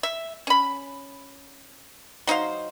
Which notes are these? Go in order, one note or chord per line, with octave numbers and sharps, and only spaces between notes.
E5
C#4 B5
F#3 D#4 C5 F5